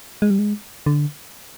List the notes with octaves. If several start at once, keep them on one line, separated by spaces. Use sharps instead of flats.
G#3
G3
G#3
D3